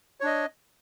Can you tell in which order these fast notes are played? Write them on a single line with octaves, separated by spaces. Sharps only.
C#5 D4 D#5